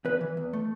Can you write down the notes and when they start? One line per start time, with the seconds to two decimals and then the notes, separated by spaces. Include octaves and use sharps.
0.05 E2 B4
0.21 E3
0.37 E2
0.53 A3